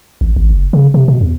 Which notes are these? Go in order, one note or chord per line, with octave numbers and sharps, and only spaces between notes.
A1
G#1
F#1
C#3
C3
B2
E2